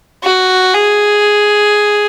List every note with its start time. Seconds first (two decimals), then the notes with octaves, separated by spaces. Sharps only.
0.24 F#4
0.74 G#4